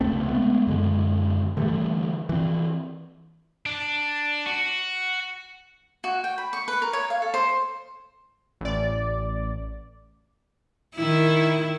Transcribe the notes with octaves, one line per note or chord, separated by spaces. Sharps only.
C#2 C3 A3 C4
G#3 A3 B3
F#2 D3 G#3
D3 E3 G3 A3
E3 C4
D4
F#4
F#4
G5
B5
C#6
B4
A#4
C#5
F5
A4
C5
A1 D5
D#3 E4